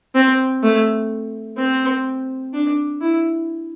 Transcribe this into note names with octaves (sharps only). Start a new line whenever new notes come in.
C4
A3
C4
D4
E4